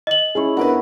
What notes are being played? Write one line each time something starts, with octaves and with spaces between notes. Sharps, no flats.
D#5 F#7
C#4 E4 G#4 C#5
B3 D4 F#4 A#4 B4